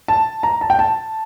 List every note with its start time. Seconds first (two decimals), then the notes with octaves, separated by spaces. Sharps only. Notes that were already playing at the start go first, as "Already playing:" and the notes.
0.08 A5
0.43 A#5
0.61 A5
0.70 G5
0.79 A5